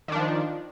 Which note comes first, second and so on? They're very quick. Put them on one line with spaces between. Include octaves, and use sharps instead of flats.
D#3 D4 F3